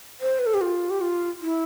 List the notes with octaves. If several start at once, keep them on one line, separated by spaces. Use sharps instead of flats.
C5
B4
A4
G4
F4
G4
F4
E4